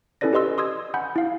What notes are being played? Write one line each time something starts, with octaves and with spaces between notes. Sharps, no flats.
C#4 E4 A4 B4 D5 A#6
G4 B4 D#5 C6 E6
C6 D#6 E6 G#6
F#5 G#5 B5 G6
E4 F5